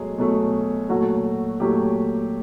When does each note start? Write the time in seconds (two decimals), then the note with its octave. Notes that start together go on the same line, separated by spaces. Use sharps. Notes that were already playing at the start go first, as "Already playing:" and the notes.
Already playing: B2 F#3 G#3 A3 G#4
0.18 B2 F#3 A3
0.89 A#2 F#3 A3 F#4
1.60 A#2 F#3 A3 G4